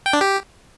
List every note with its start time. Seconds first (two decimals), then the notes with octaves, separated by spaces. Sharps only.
0.06 G5
0.13 D4
0.21 G4